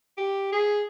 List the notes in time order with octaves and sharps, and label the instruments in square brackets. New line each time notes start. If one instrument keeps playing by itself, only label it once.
[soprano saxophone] G4
G#4